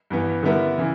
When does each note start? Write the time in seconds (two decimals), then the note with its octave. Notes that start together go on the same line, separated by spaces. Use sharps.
0.10 G2 E3 B3
0.43 D3 G3 B3 E4 A#4
0.78 C#3 E3